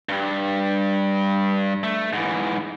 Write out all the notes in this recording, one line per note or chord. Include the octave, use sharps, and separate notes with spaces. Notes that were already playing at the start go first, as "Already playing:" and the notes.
G2 G3
A3
G#2 E3